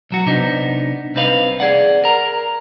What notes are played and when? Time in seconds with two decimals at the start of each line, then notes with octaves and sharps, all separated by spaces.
0.11 B1 F#3 F#4
0.26 C3 B3 D4 D#4
1.15 C2 C4 D#4 B4 F5
1.60 G#4 D5 F#5
2.04 A#4 A#5